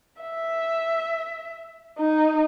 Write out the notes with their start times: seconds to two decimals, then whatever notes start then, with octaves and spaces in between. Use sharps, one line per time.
0.22 E5
1.98 D#4